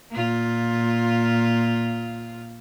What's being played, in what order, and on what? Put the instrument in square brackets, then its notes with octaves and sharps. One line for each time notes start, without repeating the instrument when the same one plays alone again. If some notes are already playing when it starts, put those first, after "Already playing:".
[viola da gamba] A#2 F4